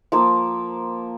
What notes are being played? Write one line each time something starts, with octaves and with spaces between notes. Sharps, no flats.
F3 A#3